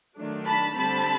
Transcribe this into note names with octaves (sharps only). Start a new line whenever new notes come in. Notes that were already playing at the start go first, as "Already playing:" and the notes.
D#3 F#3 A3 D4
A5 B5
D3 G3 C4 A5 B5